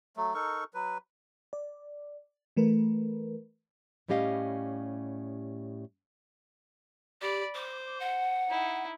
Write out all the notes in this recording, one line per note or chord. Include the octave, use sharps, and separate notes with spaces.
F#3 A3
D#4 A4 A#4 C#6
F#3 B4
D5
E3 A3 A#4 B4
A2 G3 C#4 G4 D#5 F5
G4 D5 B5
C5 D6
F#5
D#4 E4